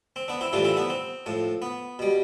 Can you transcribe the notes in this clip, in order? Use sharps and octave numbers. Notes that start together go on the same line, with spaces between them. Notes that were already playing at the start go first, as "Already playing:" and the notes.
C4
B3 D4
C4 E4
A2 E3 G3 D4 F4
C4 E4
B3 D4
C4
A2 F3
B3
B2 G3